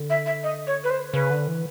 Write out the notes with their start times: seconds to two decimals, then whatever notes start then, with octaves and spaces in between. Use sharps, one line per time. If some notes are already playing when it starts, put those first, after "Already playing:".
Already playing: D3
0.10 E5
0.26 E5
0.44 D#5
0.67 C#5
0.84 B4
0.90 C5
1.14 C#3 B4
1.31 D3
1.48 E3